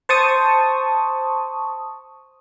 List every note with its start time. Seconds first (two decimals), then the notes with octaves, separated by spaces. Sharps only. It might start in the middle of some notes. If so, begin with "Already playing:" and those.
0.09 C5 A5 C#6 D#6